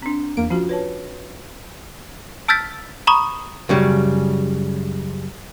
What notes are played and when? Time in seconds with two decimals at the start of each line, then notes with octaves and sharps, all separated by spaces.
0.02 C4 D4
0.37 E2 A#3 D7
0.50 F3 C#4 F4 F#4
0.69 B4 C#5 A5
2.48 A5 E6 F6 G6 A6 B6
3.07 A#5 B5 C#6 D#6
3.69 F#2 C#3 G3